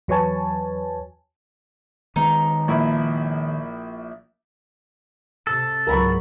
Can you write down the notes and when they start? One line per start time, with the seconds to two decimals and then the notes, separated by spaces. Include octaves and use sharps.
0.08 E2 F#3 B4 C#5 G#5 A5
2.16 D#3 G#3 B3 D#4
2.68 A#1 E4
5.47 C3 A4
5.87 C#2 G#2 F#3 A#4 B5 C#6